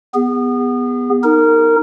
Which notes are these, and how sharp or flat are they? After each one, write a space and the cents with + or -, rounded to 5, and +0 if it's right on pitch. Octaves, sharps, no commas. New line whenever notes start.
B3 +0 G#4 -35
D#4 +5 A#4 -20